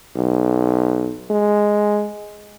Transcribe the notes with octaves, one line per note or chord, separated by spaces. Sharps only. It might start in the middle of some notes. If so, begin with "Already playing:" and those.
B1
G#3